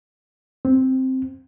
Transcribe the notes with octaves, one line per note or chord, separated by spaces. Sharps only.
C4